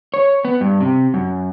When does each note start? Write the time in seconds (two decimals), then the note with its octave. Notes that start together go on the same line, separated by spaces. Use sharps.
0.14 C#5
0.45 B3
0.61 G2
0.81 C3
1.14 F#2